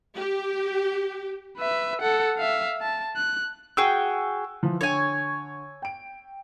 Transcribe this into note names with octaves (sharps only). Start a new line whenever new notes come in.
G4
B4 E5
A4 F#5
E5 F5
A5
F#6
F#4 G#4 G5 E6
E3 F3
D3 C#5 G#5
G5 D7